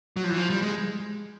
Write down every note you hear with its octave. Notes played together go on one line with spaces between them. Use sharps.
F#3
F3
E3
F3
G3
G#3